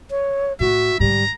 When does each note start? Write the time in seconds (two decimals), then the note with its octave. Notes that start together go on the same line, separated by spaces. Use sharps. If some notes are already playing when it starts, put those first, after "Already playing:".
0.10 C#5
0.60 A2 F#4 E5
1.00 G#2 D3 G3 A#5